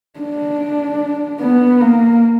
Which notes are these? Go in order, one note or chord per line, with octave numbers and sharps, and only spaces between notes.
D4
B3
A#3